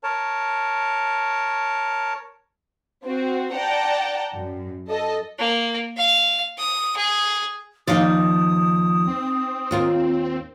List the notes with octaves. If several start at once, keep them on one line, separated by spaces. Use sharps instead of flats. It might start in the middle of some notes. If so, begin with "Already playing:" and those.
A#4 C#5 A5
C4 F#4
D5 F#5 G5 A5 A#5
F#2
A4 D#5
A#3
F5
D#6
G#4
D#2 F3 D#4 D5 F5 D#6
C4
D#2 F4 A#4